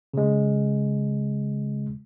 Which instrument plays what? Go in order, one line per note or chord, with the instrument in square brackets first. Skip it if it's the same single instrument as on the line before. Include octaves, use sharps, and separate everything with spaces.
[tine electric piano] C#3 G#3